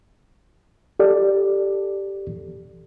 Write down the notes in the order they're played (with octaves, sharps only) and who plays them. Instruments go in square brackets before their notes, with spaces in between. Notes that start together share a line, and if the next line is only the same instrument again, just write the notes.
[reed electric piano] G4 A4 D5